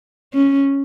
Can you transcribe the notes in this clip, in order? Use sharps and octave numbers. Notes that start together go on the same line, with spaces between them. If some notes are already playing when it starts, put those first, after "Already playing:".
C#4